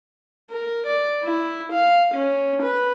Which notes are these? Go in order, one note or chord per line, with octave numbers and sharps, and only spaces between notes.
A#4
D5
E4
F5
C#4
B4